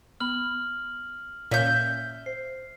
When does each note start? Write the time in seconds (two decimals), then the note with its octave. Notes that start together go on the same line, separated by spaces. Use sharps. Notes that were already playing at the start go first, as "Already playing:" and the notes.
0.20 B3 B5 F6 F#7
1.51 A#2 C#4 E5 F5 G6
2.26 C5 C7